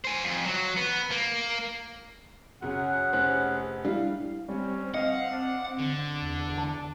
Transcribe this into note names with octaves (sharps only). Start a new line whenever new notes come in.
C5 G#5
F2
F#3
B3
A#3
F#2 C#3 C#4 G#4 F#5
F1 C5 F#6
G3 D4 E4 F5
G3 C4 C#4
D#5 F5 F#5
D4
D3
E2
A5